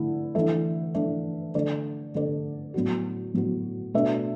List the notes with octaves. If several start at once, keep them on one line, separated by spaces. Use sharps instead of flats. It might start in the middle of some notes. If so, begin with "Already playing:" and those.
Already playing: D3 A3 E4
E3 A3 D4 A4 E5
E3 A3 D4 A4 E5
D3 A3 D4 A4 D5
D3 A3 D4 A4 D5
A2 F#3 B3 F#4
A2 F#3 B3 F#4
B2 A3 D4 B4 E5